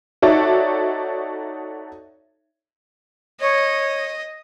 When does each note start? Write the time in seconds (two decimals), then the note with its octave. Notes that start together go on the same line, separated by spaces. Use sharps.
0.22 D#4 F#4 A4 C#5 D5 E5
3.40 C#5 D#5